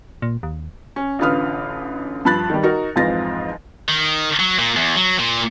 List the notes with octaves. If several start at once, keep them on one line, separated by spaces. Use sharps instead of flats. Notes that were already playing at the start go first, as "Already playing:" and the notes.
A#2
D#2
C#4
A1 D3 F4 B4 D#6 F6
G2 F3 B5 F#6 A6
D#3 G3
D#4 F#4 A#4
F2 G#2 E3 F4 A6 A#6
D#3
F#3
A#2
E2
F#3
A#2